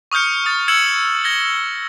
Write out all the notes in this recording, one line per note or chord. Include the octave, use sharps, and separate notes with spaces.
C#6 D#6 F6 G6 C#7
D#6 A6
E6 G#6 C#7 E7 F#7
G#6 A#6 G7